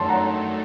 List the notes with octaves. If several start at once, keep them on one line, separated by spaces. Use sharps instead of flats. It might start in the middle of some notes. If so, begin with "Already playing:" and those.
Already playing: F#2 D#3 A3 A5 C6
F#5 A#5